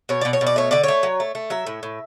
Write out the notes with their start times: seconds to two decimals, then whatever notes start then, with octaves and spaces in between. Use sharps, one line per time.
0.09 B2 C#5
0.21 B2 D5
0.33 C#5
0.41 B2
0.47 D5
0.56 A3 C#5
0.71 D3 D5
0.84 A3 C#5
1.03 F#3
1.20 A3
1.35 A3
1.50 F#3 E5
1.67 A2
1.83 A2